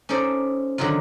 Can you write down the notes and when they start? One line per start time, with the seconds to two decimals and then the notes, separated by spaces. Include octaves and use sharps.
0.09 C#4 D#4 A4 C5 D5
0.78 D3 D#3 F#3 D#4 F4